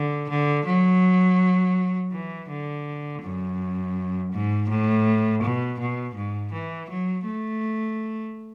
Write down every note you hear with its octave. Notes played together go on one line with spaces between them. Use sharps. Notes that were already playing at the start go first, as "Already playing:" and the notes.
Already playing: D3
D3
F#3
E3
D3
F#2
G#2
A2
B2
B2
G#2
E3
F#3
A3